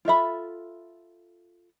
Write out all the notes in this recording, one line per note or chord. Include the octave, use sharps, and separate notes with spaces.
F4 A4 E5 B5